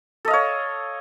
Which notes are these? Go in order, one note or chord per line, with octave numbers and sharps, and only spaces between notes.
A4 C#5 D#5 F5